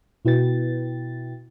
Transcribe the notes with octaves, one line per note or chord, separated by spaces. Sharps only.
B2 E4 F#4 B4 G5 A6